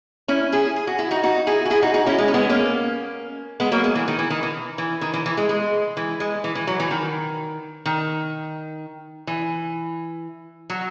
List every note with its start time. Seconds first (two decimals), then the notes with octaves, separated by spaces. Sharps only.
0.28 C#4 E4
0.52 E4 G#4
0.76 G#4
0.87 F#4
0.99 E4
1.11 D#4 F#4
1.23 D#4 F#4
1.47 E4 G#4
1.65 F#4
1.70 E4 G#4
1.82 D#4 F#4
1.94 D#4 F#4
2.06 C#4 E4
2.18 G#3
2.28 C#4
2.34 G#3 B3
2.49 A#3 C#4
3.60 G#3 B3
3.72 F#3 A#3
3.84 G#3
3.95 E3
4.08 D#3
4.19 E3
4.30 D#3
4.43 E3
4.78 E3
5.01 D#3
5.14 E3
5.26 E3
5.37 G#3
5.49 G#3
5.97 E3
6.20 G#3
6.44 E3
6.55 E3
6.67 F#3
6.80 E3
6.91 D#3
7.86 D#3
9.27 E3
10.70 F#3